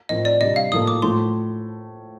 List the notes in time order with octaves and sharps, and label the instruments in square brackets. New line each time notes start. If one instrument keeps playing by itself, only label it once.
[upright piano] A2 F3 C4 F4 A#4 [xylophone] D#5
[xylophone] D5
[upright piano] C3 G3 D4 [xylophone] D#5
[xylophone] F5
[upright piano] A2 F3 A#3 F4 A4 [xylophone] D#6
[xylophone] D6
[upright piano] A2 F3 A3 [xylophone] C6